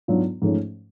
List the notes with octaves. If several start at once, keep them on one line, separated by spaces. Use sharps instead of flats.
G#2 F#3 B3 D4 F4
G#2 F3 A3 C#4